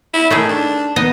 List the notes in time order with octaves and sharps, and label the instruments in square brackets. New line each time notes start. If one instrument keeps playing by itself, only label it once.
[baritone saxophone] E4
[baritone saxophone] D#3 [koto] A3 D#4 G#4
[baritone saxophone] D4
[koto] B3 D#4 D#5